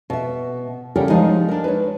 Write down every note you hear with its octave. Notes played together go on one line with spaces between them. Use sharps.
B2 E5
C#3 G3 A4 A#4 F#5 G5
F3 G#3 D#4 D#5
D4 A#4
B4 C#5